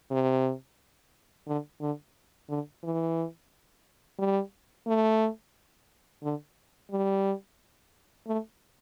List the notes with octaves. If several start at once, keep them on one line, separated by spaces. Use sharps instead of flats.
C3
D3
D3
D3
E3
G3
A3
D3
G3
A3